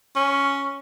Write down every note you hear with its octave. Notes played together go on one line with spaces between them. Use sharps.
C#4